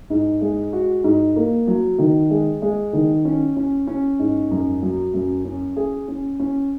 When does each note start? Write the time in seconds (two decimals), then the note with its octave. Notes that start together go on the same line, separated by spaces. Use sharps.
0.10 G#2
0.41 G#3
0.73 F#4
1.04 G#2
1.36 A#3
1.67 F#3
1.98 D#3
2.30 G#3
2.62 G#3
2.93 D#3
3.25 C#4
3.57 C#4
3.87 C#4
4.19 G#2
4.51 F#2
4.82 F#3
5.14 F#2
5.45 C#4
5.76 G#4
6.08 C#4
6.40 C#4